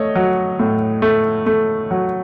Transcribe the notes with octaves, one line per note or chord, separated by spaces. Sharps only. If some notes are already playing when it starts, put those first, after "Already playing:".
Already playing: A3 C#5 D#5
F#3
A2
A3
A3
F#3